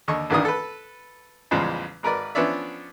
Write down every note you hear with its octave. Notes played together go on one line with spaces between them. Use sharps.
D#2 D3 D#5 C#6
A1 D2 D#3 E3 D4 D#6
A4 B4
A1 E2 C#3 F3 G3 G#3
G#1 A#4 B4 D5
F3 B3 C#4 D4 D5 E5